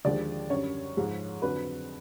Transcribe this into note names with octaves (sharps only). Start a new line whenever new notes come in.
D#2 D3 F3 G#3 D5
F#2 D3 G3 C#5
G#2 F3 G#3
F2 D3 F#3 B4